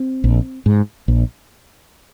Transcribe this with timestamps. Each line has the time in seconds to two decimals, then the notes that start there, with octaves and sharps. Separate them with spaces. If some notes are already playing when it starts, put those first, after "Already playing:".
Already playing: C4
0.24 A#1
0.66 G#2
1.08 A#1